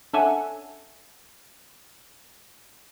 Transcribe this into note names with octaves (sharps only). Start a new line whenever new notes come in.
C#4 D4 A4 E5 F#5 G#5